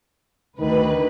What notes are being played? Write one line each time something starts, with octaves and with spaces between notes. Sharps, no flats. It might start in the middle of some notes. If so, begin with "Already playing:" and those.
D2 D#3 B4